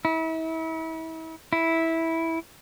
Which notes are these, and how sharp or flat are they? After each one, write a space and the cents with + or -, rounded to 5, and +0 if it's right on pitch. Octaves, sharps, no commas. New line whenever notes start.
E4 -35
E4 -10